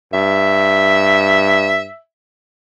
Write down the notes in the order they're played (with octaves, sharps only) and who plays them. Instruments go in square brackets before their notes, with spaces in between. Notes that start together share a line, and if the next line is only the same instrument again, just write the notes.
[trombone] G2 [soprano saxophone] E5